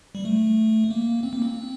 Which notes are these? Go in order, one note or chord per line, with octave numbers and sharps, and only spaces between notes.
G3
A3
A#3
C4
A#3
C4